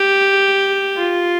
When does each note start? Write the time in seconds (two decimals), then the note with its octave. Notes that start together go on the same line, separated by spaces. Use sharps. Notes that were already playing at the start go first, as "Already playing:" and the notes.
Already playing: G4
0.96 F4